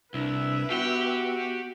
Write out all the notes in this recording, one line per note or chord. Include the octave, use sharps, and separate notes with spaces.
C2 D4 E4 B4 E5
B3 F#4 G4 G5